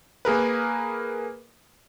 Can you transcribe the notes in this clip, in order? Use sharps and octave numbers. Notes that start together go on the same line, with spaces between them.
A#3 G#4 A#4 B4